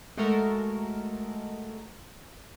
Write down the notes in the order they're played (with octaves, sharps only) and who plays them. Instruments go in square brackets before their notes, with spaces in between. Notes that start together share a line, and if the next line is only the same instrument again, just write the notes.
[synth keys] G#3 A3 F#4 A4 A#4